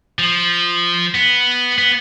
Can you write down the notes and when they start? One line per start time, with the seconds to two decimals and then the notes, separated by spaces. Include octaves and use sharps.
0.19 F3
1.15 B3
1.78 B3